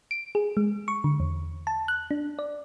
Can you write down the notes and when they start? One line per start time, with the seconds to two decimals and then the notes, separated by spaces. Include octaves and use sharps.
0.11 D7
0.35 G#4
0.57 G#3
0.88 C#6
1.04 D3
1.20 E2
1.67 A5
1.88 F#6
2.11 D4
2.39 D5